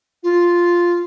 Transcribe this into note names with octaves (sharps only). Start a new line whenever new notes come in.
F4